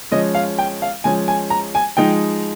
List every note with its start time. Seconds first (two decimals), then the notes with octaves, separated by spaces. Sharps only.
0.11 F3 G#3 C#4 D#5
0.35 F5
0.58 G5
0.82 F5
1.04 F3 G#3 C#4 G#5
1.28 G#5
1.50 A#5
1.75 G#5
1.97 F3 G#3 D#4 G5